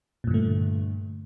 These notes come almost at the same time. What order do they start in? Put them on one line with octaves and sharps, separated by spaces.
A#2 G2 D3 A3